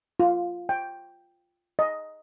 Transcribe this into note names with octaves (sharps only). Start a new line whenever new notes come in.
F4
G5
D#5